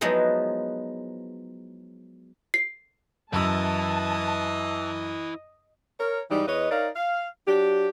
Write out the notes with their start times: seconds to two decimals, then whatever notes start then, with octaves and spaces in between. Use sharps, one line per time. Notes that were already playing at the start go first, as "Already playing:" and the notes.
0.01 F3 F#3 G#3 B3 D#4 E4
2.54 C7
3.33 F#2 E4 B4 D#5 A5 E6
6.00 A#4 C#5
6.30 G#2 E3 G3 D#4
6.48 E2 B4 C#5 D#5
6.71 D#4 A#4 C#5 D5 F5
6.96 F5
7.48 F#3 D4 G4